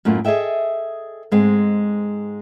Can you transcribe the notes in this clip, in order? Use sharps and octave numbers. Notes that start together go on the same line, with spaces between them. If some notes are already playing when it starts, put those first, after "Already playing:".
F#2 A2 A3 A#3 F4
G#4 A4 D#5 E5 G5
G#2 G#3 C4